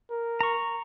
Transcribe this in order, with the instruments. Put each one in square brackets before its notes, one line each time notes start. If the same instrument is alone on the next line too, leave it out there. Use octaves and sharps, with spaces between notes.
[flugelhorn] A#4
[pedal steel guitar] A#5 C#6